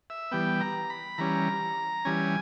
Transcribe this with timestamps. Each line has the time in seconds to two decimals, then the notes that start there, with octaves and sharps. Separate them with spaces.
0.10 E5
0.31 E3 G3 B3 G5
0.61 A#5
0.90 B5
1.18 E3 G3 C#4 A#5
2.05 E3 G3 C#4 G#5